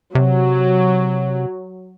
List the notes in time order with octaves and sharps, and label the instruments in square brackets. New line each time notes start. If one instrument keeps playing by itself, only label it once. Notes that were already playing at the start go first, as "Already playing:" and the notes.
[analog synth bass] C3 [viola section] F#3